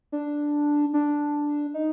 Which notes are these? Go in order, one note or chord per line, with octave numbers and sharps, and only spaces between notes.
D4
D4
D#4